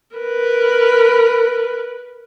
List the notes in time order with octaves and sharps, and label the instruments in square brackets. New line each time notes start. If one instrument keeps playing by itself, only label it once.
[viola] A#4 B4